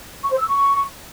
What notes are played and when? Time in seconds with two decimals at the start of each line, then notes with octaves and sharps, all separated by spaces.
0.23 C#6
0.31 C5
0.38 E6
0.46 C#6